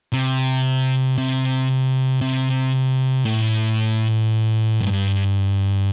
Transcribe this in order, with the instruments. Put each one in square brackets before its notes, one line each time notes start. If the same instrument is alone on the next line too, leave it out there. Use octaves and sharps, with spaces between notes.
[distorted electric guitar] C3
C3
C3
A2
G2